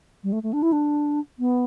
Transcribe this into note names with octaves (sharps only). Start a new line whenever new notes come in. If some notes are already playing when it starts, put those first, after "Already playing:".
G3
A3
A3
D4
E4
D4
B3